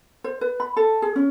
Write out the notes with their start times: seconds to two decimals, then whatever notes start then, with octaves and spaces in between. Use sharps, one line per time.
0.24 C5
0.41 B4
0.60 B5
0.77 A4
1.02 G#4
1.16 C#4